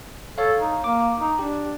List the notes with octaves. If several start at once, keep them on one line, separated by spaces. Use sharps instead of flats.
A4 C#5 F5
D#4
A#3 D6
D#4
D4 G4